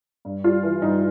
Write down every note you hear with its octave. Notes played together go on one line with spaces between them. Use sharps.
G2
G3 F4
E3
G2 D#4